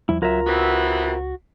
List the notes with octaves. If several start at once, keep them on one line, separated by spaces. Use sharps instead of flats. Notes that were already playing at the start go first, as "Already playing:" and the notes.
E2 F3 G3 E4
C#2 F#3 F4 A#4 E5 A#5
C3 E3 B3 F#4